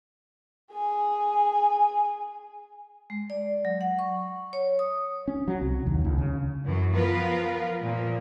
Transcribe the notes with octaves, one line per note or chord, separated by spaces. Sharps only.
G#4 G#5
G#3
D5
F#3
F#5
C#6
C#5
D#6
C#4
F#3
C2
D#2
C#2
C#3
F#2 E3 F#3
F3 B3 F4 A#4 B4 F5
A#2 F3 A#3